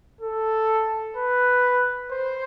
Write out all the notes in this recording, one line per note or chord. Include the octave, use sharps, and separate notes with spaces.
A4
B4
C5